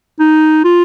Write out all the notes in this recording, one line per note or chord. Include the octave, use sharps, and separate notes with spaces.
D#4
F4